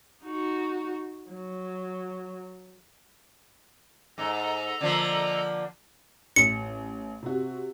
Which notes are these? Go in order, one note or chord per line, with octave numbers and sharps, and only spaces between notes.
D#4 F#4
F#3
G#2 A4 D#5 A#5
D3 F3 A#3
A1 C#7
C3 F#4